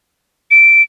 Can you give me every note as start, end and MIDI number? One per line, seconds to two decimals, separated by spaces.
0.51 0.83 98